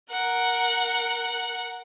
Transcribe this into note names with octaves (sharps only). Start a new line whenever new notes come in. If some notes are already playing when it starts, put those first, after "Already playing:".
A#4 F#5